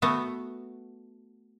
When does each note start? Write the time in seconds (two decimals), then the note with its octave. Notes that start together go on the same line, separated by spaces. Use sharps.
0.02 A3 B3 F#4